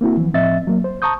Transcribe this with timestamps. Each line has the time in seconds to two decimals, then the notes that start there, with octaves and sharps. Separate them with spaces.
0.01 A#3 C4 E4 F#4
0.17 E3 F3
0.34 A2 F3 C4 D#5 E5 A6
0.67 F#3 A#3
0.84 C5
1.02 A5 A#5 C#6 D#6 G6